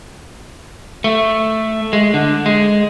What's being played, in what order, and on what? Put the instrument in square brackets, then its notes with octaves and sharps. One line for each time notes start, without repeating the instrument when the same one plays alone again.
[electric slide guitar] A3
G#3
D3
G#3